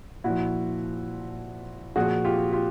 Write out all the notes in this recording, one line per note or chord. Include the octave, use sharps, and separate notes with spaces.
A#2 F3 E4 F#4
A#2 F3 F#4 G#4
F4 G4
F4 G4